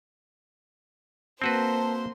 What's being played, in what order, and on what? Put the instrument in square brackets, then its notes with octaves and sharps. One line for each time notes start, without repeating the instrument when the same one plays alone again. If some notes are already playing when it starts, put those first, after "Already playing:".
[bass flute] A#3 [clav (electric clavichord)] C4 F#4 B4 [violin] C5 C6 [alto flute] A5